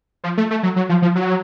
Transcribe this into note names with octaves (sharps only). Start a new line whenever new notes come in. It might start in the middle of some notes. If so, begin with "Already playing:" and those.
F3
A3
A3
F#3
F#3
F3
F3
F#3